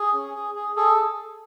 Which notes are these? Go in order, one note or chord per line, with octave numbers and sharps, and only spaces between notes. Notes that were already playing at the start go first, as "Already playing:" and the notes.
Already playing: G#4
C#4
G#4
G#4
G#4 A4